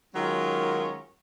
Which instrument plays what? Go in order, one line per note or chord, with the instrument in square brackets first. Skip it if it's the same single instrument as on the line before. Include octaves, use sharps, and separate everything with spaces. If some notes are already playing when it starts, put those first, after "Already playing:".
[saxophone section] D#3 F#3 G#3 C#4 F4 A#4